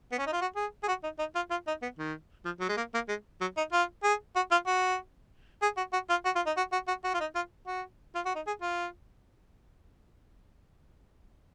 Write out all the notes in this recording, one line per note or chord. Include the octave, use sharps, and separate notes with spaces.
B3
C#4
D#4
F4
F#4
G#4
G#4
F#4
D#4
D#4
F4
F4
D#4
B3
D#3
F3
F#3
G#3
A#3
A#3
G#3
F#3
D#4
F4
G#4
F#4
F4
F#4
G#4
F#4
F#4
F4
F#4
F4
D#4
F#4
F#4
F#4
F#4
F4
D#4
F4
F#4
F4
F#4
D#4
G#4
F4